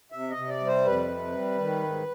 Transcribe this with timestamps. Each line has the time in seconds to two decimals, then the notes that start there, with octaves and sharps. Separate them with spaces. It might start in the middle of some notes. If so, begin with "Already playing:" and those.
0.12 C3 E5
0.30 D#5
0.37 C3
0.49 D5
0.60 G3
0.67 C5
0.86 F2 B4
1.09 C3
1.34 G3
1.59 D#3
1.83 G#2